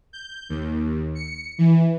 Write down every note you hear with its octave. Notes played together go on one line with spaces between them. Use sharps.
G6
D#2
C#7
E3